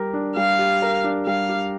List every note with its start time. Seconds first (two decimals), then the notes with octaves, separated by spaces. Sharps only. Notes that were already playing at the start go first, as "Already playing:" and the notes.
Already playing: G3 G4 A#4
0.14 D4
0.36 G3 F5
0.58 G4
0.82 A#4
1.04 D4
1.26 G3 F5
1.49 G4